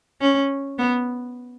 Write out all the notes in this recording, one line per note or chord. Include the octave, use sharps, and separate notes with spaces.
C#4
B3